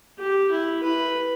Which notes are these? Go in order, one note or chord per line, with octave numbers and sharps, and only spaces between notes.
G4
E4
B4